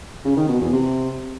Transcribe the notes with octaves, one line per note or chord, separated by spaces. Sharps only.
C#3
D#3
B2
E2
C3